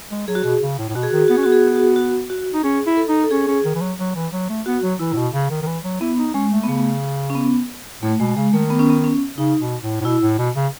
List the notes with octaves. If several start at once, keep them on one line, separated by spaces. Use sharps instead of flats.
G#3
F#3 G#4
F#4
B2 G#4
C#3
A2
A2
B2 F#4
G#4
D#3 F#4
G#4
B3 F#4
C#4 G#4
B3 F#4
G#4
F#4
G#4
F#4
F#4
F#4
D#4
C#4 G#4
E4
A4
D#4
A4
C#4 G#4
C#4
D#3
E3
F#3
F#3
E3
F#3
A3
B3 F#4
F#3
E3 E4
A2
B2
C#3
D#3
D#3
E3
F#3
B3 E4
D#4
G#3 C#4
A3
B3
C#3 A3
C#4
B3
A2 A3
B2 G#3
C#3 G#3
D#3 A3
B3
C#4
B3
C#4
C#3 D#4
B2
A2
A2
B2 E4
A2
B2
C#3